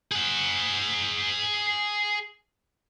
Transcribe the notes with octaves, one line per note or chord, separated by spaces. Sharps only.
G#4 F#5